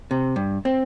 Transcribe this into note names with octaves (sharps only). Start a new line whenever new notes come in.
C3
G2
C4